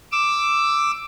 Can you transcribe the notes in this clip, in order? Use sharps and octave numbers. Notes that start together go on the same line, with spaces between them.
D6 E6